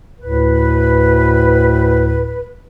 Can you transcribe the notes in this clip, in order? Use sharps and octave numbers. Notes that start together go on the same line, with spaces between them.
D2 A2 B4